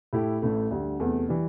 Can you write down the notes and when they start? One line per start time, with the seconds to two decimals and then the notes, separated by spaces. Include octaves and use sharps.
0.13 A2 A3 E4 G4
0.42 A1 A2 A3
0.71 D2 D3 G3
1.00 E2 C3 A3
1.29 E3 G3